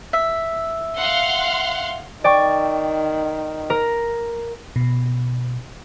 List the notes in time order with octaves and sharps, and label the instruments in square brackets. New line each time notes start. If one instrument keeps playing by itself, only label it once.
[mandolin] E5
[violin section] F5 F#5 C6
[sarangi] D#3 [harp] D5 G5 C#6
[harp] A#4
[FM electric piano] B2